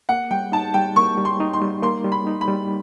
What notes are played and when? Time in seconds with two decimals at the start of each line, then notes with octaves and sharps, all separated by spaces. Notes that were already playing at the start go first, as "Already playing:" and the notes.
0.09 A#3 F#5
0.31 G3 G5
0.52 D#4 A5
0.74 G3 G5
0.96 A#3 C#6
1.17 G3
1.25 C6
1.40 D#4
1.53 C6
1.62 G3
1.82 A#3 C6
2.05 G3
2.12 B5
2.27 D#4
2.41 B5
2.48 G3